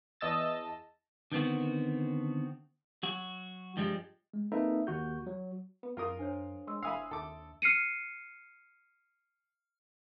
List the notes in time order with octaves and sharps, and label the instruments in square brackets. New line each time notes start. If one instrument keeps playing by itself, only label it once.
[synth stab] E2 D#5 A5 E6 A6
[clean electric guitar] D3 D#3 B3 C4 F#4
F#3 F#4
G2 F3 G3 G#3
[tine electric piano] G#3
A#3 C4 D#4 A4 B4 E5
D#2 F#4 G6
F#3
[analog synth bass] B3
[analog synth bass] F#2 [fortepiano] F4 A#4 D#6
[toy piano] D4 C5 C#5
[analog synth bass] G#3 [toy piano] C6 E6
[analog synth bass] F1 [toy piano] E5 D#6 E6 [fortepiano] F5 G#5 B5
[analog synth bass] D#2 [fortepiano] A4 D6
[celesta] F6 C7 C#7 D#7